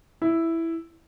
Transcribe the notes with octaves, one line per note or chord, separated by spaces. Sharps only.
E4